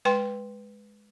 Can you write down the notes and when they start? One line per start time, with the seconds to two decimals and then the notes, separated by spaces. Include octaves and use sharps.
0.05 G#3 B4 G5 C6